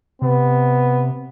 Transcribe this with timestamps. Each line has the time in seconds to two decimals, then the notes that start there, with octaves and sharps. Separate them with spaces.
0.22 C3 B3